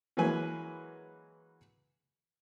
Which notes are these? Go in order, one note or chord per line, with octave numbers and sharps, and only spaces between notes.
E3 F#3 G#3 A#3 B4 G#5